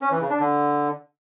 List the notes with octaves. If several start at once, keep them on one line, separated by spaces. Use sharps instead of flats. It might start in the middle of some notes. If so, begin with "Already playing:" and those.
C#4
E3
C#3
D4
D3